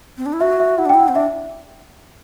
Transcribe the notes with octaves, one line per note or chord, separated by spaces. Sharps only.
C4
D4
E4
F#4 E5
E5
E4 F#5
D4
E4 G5
F#5
C4
D4 E5